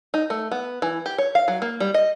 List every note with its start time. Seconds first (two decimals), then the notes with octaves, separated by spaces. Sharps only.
0.14 D#4
0.30 A3
0.51 B3
0.82 E3
1.06 G4
1.18 C#5
1.35 F5
1.48 F#3
1.62 A#3
1.80 G3
1.94 D#5